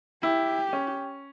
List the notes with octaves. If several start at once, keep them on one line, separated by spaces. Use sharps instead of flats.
E4 G4
C#4